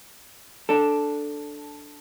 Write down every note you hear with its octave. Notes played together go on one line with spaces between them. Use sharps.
D4 A4